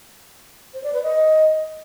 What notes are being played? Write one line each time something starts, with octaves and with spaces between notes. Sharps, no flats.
C5
D5
B4
D#5